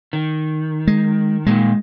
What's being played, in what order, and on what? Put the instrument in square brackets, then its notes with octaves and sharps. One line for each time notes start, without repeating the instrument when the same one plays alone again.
[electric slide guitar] D#3
[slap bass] G#3
[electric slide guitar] A#2 D3 D#3 [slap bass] G#3